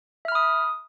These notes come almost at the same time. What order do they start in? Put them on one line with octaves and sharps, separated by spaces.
E5 F6 B5 D#6